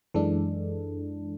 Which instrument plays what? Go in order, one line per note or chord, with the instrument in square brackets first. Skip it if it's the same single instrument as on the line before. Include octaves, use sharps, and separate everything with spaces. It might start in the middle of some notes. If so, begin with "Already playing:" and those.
[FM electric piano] F#2 E3 G#3 D4 A4